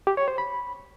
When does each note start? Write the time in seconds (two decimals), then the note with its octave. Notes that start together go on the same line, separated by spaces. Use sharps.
0.07 G4
0.17 C#5
0.28 C5
0.38 B5